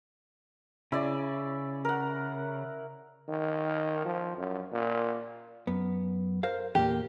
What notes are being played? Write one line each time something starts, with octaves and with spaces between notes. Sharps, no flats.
C#3 E4 D5
A#4 F#5
D#3
F3
F#2
A#2
F#2 B3
A#4 C5 F5
E2 A#2 A#3 G4